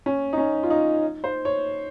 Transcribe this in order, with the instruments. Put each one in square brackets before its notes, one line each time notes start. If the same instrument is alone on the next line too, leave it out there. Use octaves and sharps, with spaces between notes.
[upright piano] C#4
D#4
C#4
F4
D#4
C5
C#5